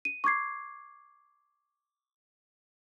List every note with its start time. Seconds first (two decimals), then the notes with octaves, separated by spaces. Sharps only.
0.05 D#7
0.24 C#6 D6 G#6 C7